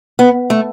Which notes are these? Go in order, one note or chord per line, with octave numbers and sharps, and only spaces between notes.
B3
A3